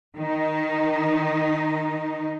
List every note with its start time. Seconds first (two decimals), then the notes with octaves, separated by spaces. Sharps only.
0.17 D#3 D#4